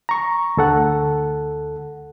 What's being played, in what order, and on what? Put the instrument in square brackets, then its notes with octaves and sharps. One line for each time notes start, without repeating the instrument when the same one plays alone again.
[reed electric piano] A#5 C#6
D2 A4 F#5